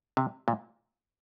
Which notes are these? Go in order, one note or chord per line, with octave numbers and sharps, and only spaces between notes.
C3
A#2